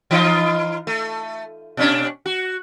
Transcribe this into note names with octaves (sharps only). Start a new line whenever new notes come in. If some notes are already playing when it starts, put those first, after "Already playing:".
E3 D#4 F4
A3
B2 C#4 D4
F#4